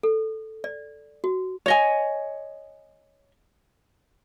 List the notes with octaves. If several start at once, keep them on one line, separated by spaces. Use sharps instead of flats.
A4
D5
F#4
C#5 D#5 G#5